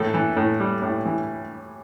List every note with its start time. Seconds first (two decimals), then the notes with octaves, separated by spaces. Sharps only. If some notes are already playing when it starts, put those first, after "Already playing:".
Already playing: A2 E3 A4
0.14 E3
0.37 A2
0.60 G3
0.82 A2
1.05 E3